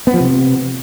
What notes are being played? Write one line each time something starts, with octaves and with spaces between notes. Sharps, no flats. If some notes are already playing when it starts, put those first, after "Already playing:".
B3
F3
C3